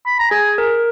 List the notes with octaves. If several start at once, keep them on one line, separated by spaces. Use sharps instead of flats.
B5
A#5
G#4 G#5
A#4